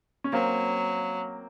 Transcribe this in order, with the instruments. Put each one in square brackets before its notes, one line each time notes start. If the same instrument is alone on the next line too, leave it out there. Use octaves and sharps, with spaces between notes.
[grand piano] C#4
[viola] F#3 [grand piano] A#3 C4